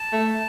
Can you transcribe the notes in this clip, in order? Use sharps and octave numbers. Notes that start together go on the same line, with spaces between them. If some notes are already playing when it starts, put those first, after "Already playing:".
Already playing: A5
A3